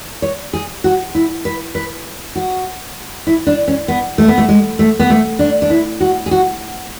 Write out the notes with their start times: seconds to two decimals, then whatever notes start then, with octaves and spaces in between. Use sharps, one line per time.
0.22 C#5
0.53 G#4
0.84 F#4
1.15 E4
1.45 B4
1.75 B4
2.36 F#4
3.27 E4
3.47 D4
3.68 C#4
3.88 B3
4.18 A3
4.28 B3
4.38 A3
4.49 G#3
4.79 A3
4.99 B3
5.10 A3
5.39 D4
5.62 D4
5.70 E4
6.01 F#4
6.26 G#4
6.31 F#4